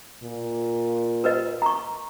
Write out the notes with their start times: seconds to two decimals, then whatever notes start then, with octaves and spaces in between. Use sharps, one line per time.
0.23 A#2
1.24 A#4 B4 D#5
1.62 A#5 C#6